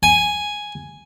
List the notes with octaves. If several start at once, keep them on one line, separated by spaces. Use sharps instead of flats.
G#5